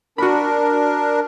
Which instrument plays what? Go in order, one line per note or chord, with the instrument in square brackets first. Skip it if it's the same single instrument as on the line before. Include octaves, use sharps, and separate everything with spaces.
[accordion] D4 A#4 [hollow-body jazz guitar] F#4 B5